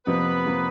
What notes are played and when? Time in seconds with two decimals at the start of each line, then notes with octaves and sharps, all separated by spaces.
0.06 F2 C3 F3 A#3 B3 B4
0.46 C3 F3 A#3